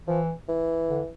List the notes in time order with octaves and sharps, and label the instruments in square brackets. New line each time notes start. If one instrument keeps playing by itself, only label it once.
[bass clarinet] E3 [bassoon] F3
[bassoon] E3
[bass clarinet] D3